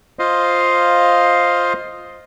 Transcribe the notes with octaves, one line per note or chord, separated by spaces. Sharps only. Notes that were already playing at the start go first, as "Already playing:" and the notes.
F4 C5 D#5 F5